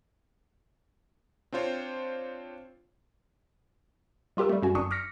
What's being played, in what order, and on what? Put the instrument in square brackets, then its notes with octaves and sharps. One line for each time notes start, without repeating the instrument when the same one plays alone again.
[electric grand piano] C4 D4 F4 C5 C#5
[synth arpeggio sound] G3 F4 G4 A#4 E6
G3 A3
F#2 F#4 G#5
G1 F#2 F#3 D4 C#6 D#6
D6 F6 A#6 B6 C#7